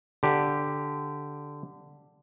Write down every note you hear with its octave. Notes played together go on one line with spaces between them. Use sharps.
D3 G4